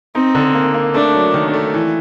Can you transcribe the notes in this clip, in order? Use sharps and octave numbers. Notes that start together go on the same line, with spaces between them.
C4 D#4
D3
A#3
A#3
A3 D4
F#3
D#3
A3
E3